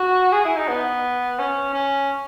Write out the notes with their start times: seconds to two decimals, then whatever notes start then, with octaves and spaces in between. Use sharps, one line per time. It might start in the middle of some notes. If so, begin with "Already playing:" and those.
Already playing: F#4
0.32 G#4
0.45 E4
0.56 D#4
0.68 B3
1.39 C#4
1.73 C#4